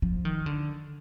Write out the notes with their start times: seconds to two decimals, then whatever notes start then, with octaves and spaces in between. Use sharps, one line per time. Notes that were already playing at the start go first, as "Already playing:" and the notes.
0.02 F3
0.25 D#3
0.46 D3